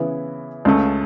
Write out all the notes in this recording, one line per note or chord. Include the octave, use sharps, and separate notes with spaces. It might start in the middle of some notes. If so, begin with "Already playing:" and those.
Already playing: C#3 E3 B3 E4
C#2 C#3 A3